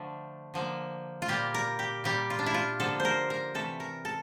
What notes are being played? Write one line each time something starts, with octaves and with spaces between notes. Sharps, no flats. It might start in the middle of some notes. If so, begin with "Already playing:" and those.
Already playing: D3 F3 A3
D3 F3 A#3
F4
A#2 G3 A#3 G4
A#4
G4
A#2 G3 A#3 G4
F4
D4
E4
F4
D3 F3 A#3 A4
C5
A#4
A#4
C3 E3 A3 A4
A#4
A4